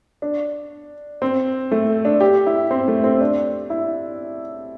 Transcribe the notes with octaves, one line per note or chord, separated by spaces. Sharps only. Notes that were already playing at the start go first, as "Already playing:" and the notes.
D4
C4
A3
D4
G4
E4
C4
A3
C4
D4
E4